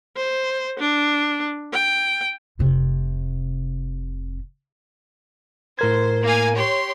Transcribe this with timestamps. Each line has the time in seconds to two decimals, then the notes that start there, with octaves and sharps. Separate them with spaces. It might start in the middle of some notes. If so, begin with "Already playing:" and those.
0.16 C5
0.80 D4
1.73 G5
2.59 F1 C3
5.79 A2 A#4 C5 G#6
6.25 A#3 F5 G#5
6.55 G4 C#5 C6